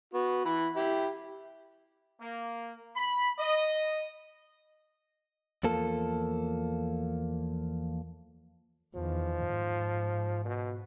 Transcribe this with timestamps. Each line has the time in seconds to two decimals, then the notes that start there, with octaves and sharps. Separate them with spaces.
0.14 B3 F#4
0.45 E3 B5
0.76 E4 G4
2.20 A#3
2.96 B5
3.39 D#5
5.63 E2 F3 A#3 A4
8.95 E2 D#3 F3
9.47 G#2
10.45 B2